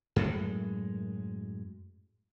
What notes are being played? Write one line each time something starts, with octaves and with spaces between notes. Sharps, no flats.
F#2 A2 G#3